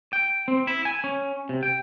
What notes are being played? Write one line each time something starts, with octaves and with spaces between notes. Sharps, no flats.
G5
C4
E4
G#5
C#4
C3
G5